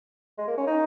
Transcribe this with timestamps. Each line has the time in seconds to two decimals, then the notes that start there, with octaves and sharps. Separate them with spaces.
0.38 G#3
0.48 A#3
0.58 C#4
0.67 D#4